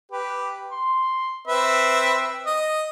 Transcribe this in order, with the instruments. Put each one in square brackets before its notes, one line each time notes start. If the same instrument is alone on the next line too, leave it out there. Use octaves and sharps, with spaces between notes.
[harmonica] G4 B4
C6
C4 B4 E5
D#5